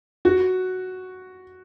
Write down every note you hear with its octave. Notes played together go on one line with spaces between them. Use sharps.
F#4